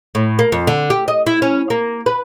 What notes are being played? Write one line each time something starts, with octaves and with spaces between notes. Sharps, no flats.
A2
A#3
F2
D3
G4
D#5
E4
C#4
A#3
B4